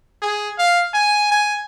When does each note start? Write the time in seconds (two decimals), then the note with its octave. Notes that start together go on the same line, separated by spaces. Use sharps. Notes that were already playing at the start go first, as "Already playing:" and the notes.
0.22 G#4
0.58 F5
0.94 G#5
1.32 G#5